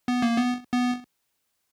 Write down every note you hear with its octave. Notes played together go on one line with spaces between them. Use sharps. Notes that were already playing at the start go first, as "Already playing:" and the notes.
B3
A#3
B3
B3